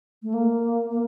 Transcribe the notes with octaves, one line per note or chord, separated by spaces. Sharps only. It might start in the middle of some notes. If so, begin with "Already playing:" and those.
A3
A#3
A#3